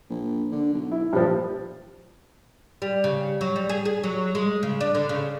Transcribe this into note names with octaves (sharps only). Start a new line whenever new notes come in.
A#1
D3
B1
E4
A#1 G2 A#2 F3
G3
C#3
F#3
G3
G#4
G#4
F#3
G#3
C#3
D4
D3
C#3